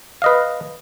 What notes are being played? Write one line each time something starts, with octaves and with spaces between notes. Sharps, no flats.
B4 D#5 F5